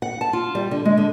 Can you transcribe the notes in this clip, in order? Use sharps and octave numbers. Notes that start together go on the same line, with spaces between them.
F#5
A5
F4
G3
D3
G#3
D3